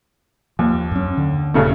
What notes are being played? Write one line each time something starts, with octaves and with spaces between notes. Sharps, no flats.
D#2 F3
F#2 C#4
D3
D#1 G2 C#3 A3